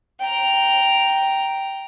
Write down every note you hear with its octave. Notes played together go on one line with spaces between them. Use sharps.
G5 A#5